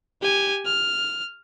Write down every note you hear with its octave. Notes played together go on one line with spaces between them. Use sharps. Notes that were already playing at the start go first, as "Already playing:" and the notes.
G4 G#5
F6